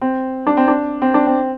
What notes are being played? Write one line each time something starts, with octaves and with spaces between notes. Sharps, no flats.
C4
D4
C4
D4
C4
D4
C4